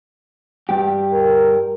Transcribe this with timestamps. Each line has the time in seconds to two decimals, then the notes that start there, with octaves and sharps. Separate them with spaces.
0.69 G2 G4
1.13 A#4